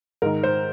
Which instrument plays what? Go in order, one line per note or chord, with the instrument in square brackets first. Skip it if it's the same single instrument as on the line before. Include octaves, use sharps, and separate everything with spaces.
[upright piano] G#2 D#3 A#4
C5